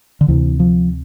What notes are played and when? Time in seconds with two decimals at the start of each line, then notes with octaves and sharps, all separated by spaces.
0.21 D3
0.28 D2 C3 E3
0.60 F3